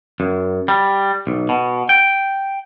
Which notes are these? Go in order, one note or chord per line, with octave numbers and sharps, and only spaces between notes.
F#2
G3
B1
B2
G5